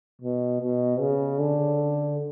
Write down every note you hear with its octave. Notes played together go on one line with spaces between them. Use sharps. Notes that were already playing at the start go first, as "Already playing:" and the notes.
B2
B2
C#3
D3